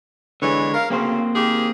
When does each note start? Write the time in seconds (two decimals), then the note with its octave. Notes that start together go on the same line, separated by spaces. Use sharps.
0.42 D3 E3 G#3 B3 C#5
0.74 A#4 F5
0.90 D2 C#3 A#3 C4 C5
1.35 D#3 G4 G#4